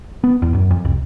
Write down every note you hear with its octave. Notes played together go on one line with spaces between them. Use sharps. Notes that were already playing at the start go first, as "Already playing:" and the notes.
B3
E2
F#2
F2
C2